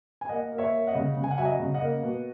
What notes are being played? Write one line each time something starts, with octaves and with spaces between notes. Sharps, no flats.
G#5
A#3 D#5 F#5
A#3
C#5 E5
A#3
D#5 F#5
C#3
C#3
G#5
F#5
F#3 E5 G#5
D#5 F#5
C#3
D#5 F#5
A#3
B2